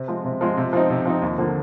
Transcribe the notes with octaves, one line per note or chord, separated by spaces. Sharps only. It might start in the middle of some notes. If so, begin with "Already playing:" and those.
Already playing: C3
F3 G#3 C4
C3
F3 G#3 C4
C3
F3 C4 D#4
C3
F3 C4 D#4
D#2
D3 F3 A#3